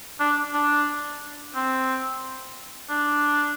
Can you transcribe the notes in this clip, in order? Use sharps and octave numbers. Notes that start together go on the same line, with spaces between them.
D4
D4
C4
D4